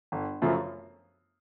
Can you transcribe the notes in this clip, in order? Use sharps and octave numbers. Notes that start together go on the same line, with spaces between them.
G1
F#2 C#3 F3 A3